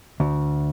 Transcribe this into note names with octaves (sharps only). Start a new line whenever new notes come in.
D2